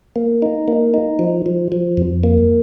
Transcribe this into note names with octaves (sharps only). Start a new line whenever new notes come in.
A#3
D#4
A#3
D#4
F3
F3
F3
F2
A#3